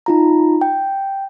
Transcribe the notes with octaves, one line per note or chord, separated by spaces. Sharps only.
D#4 F4 A#5
G5